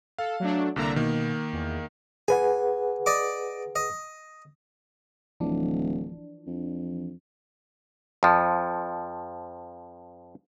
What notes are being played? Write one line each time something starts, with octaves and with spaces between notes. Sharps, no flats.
A4 F5
F#3 A3 D4
C2 D3 A#3 D5 E5 A#5
B2 D#3 A#3
E2
G#4 B4 F#5 G#5
D5 D#5 D6
D#5
D1 E3 F3 D4
F2
F2 F3